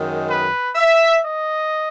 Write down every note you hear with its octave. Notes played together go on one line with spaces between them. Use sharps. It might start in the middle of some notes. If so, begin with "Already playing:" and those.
Already playing: F#2 D#3 G#3
B4
E5
D#5